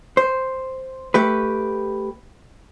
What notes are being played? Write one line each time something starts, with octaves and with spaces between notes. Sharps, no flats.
C5
A3 G4 B4